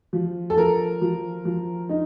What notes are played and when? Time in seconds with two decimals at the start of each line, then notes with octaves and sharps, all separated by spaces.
0.13 F3
0.50 A4
0.57 F3 A#4
1.01 F3
1.45 F3
1.89 D#4